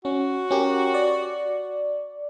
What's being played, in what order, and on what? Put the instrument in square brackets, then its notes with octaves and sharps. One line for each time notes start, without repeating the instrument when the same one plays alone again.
[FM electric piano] C#4 [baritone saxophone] F#4
[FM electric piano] C#4 G4 A#4
D5